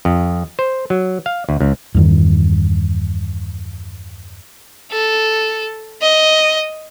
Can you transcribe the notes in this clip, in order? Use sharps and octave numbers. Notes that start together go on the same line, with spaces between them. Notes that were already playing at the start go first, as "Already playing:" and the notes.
F2
C5
F#3
F5
D2
C#2
E2 G2 D#3
A4
D#5